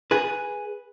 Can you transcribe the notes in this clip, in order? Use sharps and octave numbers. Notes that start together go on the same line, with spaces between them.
G#4 B4